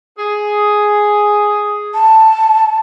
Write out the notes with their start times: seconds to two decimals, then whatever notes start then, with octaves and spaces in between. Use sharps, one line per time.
0.17 G#4
1.94 A5